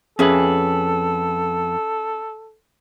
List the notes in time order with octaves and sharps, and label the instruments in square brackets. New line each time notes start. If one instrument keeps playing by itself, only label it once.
[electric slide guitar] F2 B4 [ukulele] C#4 G#4 E5 [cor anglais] A4